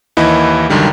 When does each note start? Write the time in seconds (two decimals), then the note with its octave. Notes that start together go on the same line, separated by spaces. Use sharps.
0.17 D#2 E3 E4 D#5 B5
0.70 C#2 F#2 D3 D#3 G3